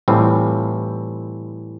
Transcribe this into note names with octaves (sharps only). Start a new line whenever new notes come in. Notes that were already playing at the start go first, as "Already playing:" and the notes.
A2 E3 G3 C4 F4